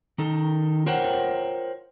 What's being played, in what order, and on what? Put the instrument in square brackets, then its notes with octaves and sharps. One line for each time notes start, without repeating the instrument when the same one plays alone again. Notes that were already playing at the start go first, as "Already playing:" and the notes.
[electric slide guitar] D#3 D#4 A4
F4 A#4 C5 C#5 F#5 G5